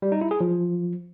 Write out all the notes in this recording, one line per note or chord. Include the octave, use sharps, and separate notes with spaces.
G3
D#4
E4
G#4
F3